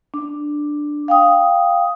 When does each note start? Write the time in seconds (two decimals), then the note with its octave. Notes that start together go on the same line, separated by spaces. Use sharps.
0.14 D4
1.08 F5 G5 D#6